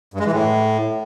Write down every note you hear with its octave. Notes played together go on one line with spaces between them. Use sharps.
G2
G#3
E3
A2